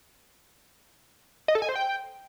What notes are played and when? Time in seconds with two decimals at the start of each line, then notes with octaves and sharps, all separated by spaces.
1.48 D#5
1.55 A4
1.62 G#5
1.69 C5
1.75 G5